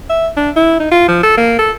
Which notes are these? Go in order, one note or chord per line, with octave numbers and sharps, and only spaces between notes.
E5
D4
E4
D#4
F4
F3
A4
A#3
A4